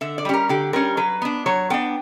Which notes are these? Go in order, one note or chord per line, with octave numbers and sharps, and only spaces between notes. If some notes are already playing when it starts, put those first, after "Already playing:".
D3 E5
D5
G3 C#4 G4
A#4
D3 G4
G3 C#4 A#4
F#3 B4
B3 D4
F#3 C#5
B3 D4 G5